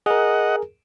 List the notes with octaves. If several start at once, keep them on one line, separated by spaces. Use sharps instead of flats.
G#4 A#4 D#5 F#5